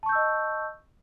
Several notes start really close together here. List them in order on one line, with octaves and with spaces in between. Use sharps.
A5 C#6 G6 E6 D#5